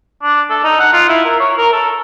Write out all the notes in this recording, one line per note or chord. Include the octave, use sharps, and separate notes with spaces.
D4
A4
D#4
F#5
F4
E4
A#4
C#5
A#4
A4